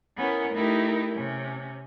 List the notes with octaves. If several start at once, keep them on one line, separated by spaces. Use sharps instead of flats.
B3 C#4 E4 A#4
A3 D#4 E4 G4 A#4
C3 C#4